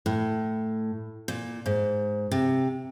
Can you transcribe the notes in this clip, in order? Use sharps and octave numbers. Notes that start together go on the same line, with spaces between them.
A2
A#2
G#2
C3